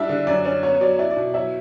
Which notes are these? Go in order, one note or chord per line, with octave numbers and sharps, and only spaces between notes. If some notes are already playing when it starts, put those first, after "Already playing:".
Already playing: G3 D4 E4 E5
D3
F#2 D5
C#4 D5
B3 C#5
C#5
F#3 D5
E4 D5
D5
B2
F#3 E4 E5